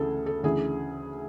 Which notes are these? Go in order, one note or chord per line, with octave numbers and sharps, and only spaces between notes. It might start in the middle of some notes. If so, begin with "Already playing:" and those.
Already playing: D2 C#3 E3 A3 G#4 A4
A4
D2 C#3 E3 G#4